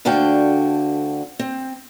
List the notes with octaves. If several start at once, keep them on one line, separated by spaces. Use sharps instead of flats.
D2 D3 D4 F#4 F5 G5
C4